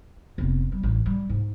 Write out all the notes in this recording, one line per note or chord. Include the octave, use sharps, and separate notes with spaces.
F1 B3
G3
A1
G3
G#2